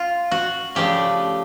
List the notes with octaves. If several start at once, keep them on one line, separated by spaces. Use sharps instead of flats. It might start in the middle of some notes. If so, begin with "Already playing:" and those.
Already playing: F4
F#4
C#3 F3 A3 D4 G4